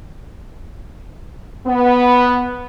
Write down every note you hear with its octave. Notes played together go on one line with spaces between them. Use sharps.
B3